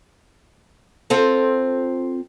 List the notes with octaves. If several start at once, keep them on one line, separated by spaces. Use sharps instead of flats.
C4 F4 A4